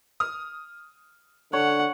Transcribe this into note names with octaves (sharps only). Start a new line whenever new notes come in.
D#6 F6
D3 C#5 F#5